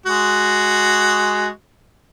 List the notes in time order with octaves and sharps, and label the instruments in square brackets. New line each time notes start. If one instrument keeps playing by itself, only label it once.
[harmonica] G#3 F#4